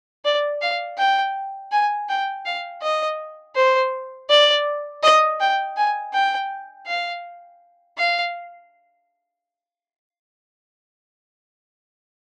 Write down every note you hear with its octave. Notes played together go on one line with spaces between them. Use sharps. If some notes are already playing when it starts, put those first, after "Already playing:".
D5
F5
G5
G#5
G5
F5
D#5
C5
D5
D#5
G5
G#5
G5
F5
F5